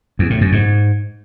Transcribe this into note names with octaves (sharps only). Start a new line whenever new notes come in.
E2
A2
F#2
G#2